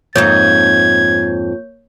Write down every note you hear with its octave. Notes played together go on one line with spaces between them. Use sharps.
F2 G#2 A#3 D#4 C#5 G6 G#6